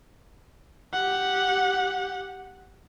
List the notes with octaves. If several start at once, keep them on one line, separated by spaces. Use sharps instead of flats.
G4 F#5